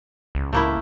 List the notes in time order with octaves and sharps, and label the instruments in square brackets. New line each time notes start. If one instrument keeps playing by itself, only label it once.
[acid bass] C#2
[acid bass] C#2 [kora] A3 A#3 E4